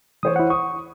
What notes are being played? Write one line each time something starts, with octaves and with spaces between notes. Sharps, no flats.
E3 C5 C#5 D#6
E4 F#5
C#6 D#6